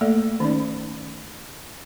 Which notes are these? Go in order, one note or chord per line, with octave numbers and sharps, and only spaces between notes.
A3 A#3 A4 D5
D#3 C#4 D#4 D5